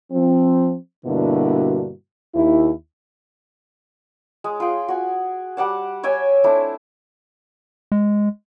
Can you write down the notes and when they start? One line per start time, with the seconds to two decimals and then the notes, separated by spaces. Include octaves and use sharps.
0.12 F3 C4
1.06 G2 B2 D3 A#3 E4 F#4
2.35 D#2 E4
4.44 G#3
4.60 F4 G#4 G5
4.88 F#4 G#5
5.57 G3 G4 F#5 A5
6.03 C#5 E5 G5 G#5
6.44 A3 C4 D4 E4
7.92 G#3